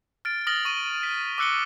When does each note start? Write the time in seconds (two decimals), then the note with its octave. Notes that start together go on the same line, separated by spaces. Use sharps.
0.25 F6 A6 D7
0.47 D#6 F6 A6 A#6 F#7 G7
0.65 C#6 A#6 D#7
1.03 B6
1.38 D6 E6 F#6 C#7 D7 G7